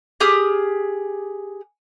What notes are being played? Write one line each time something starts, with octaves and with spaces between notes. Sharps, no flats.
G4 G#4 D#6 F6